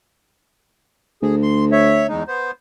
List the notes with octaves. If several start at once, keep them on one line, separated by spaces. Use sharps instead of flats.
D2 G#4
C6
C#5 E5
E2 G#3 D#4
B3 C5